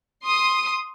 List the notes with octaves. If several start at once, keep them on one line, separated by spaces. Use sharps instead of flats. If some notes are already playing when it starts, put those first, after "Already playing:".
C6 D#6